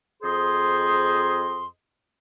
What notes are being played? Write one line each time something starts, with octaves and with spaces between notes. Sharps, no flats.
F2 G#4 C5 D#5 C6